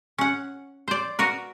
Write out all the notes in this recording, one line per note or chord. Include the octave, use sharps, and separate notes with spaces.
C#4 F#5
C5 D5
F#4 A#4 B4